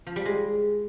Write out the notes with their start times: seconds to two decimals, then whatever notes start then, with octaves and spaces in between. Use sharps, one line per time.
0.07 F3
0.16 G3
0.25 G#3